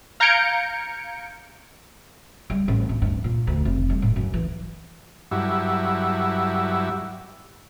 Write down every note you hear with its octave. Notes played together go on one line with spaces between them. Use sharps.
F5 A#5 G6 G#6 C#7 D7
G3
A1
D1
G2
A#2
D2
F1
G3
A2
F#2
E3
G2 F#3 E4